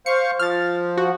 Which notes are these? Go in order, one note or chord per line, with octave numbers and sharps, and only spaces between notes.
C5 F5 C#6 C#7
F3 F6 A6
F#4